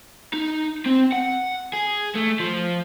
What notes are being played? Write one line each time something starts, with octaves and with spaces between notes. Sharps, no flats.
D#4
C4
F#5
G#4
A3
F3